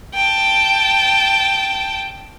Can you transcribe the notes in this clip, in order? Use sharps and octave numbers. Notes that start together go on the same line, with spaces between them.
G5 A5